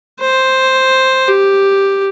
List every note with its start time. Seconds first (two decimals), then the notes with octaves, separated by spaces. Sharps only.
0.21 C5
1.29 G4